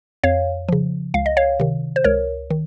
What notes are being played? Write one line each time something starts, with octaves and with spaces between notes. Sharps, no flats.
F2 C#5 F5
C#3 F3
C#2 F5
D#5
C#5 F5
C3 D#3
C5
C#2 A#4 C#5
D#3